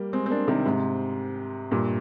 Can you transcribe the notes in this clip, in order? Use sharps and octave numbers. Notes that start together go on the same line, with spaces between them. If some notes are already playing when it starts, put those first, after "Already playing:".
Already playing: G3 A#3
G#3 C4
C4
A#3 D4
C3 D#3
G#2 C3
G2 A#2